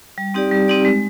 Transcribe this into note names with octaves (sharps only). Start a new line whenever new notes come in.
G3
C4 D#4 G4 D5
G3
C4 D#4 G4 D5
G#3